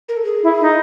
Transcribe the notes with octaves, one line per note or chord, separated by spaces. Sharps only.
A#4
A4
G#4
E4
D#4